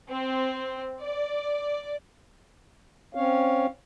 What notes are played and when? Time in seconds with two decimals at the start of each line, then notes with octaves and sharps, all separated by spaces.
0.10 C4
1.02 D5
3.15 C4 C#4 C#5 F5